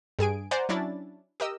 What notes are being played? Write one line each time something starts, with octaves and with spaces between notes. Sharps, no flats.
G2 G#4 G#5 D7
C5 D5 F#5 G#5 A#5
F#3 C#4 D4 E4 A6
G4 A#4 D#5 E6